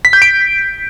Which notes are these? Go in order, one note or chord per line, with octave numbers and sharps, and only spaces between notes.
B6
G6
D7